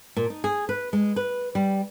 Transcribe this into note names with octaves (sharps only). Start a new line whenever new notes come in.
A#2
D#4
G#4
B4
G#3
B4
G3